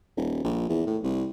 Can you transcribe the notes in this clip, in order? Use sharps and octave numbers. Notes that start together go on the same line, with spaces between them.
D#1
A#1
E2
A2
C2